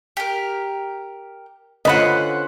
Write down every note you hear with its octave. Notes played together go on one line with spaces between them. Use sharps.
G4 A#4
D3 C#4 F4 B4 C5 D#5 F#5 B5